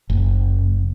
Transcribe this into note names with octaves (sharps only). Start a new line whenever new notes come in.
F#1